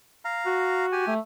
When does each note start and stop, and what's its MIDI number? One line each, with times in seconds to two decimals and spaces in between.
0.25 0.86 77
0.25 0.86 82
0.46 1.03 66
0.92 1.14 67
0.92 1.14 80
1.07 1.19 57